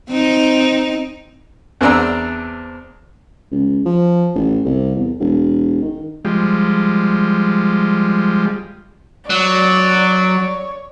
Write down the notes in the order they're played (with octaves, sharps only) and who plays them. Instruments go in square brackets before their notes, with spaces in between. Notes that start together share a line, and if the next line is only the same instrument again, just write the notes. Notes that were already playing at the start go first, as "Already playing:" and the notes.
[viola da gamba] C4 D#4
[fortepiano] E2 C4 D4 D5 A#5 E6
[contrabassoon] C#2
F3
A1
C2
E2
E1
D#3
[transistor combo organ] F3 G3 G#3
[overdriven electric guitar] F#3 [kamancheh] C#5 [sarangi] D5